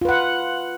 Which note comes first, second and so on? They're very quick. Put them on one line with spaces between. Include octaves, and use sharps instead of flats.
F4 B4 F#5